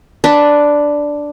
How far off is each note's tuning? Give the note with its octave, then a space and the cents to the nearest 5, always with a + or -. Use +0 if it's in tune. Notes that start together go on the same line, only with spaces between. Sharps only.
D4 +0 B4 +0